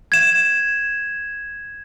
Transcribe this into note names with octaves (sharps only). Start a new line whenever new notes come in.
G#6 E7